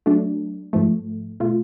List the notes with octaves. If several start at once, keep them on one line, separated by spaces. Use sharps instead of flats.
F#3 A3 D4
G#2 F3 A3
B2 A3 F4